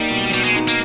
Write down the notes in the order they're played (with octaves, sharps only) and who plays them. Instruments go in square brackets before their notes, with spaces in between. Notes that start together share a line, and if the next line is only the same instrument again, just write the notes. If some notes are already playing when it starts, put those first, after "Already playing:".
Already playing: [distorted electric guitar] G3 [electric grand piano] A#3 D#4
[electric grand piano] B2
[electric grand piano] B2 [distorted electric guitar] G3
[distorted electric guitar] G#3
[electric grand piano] D#4
[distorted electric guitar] A#3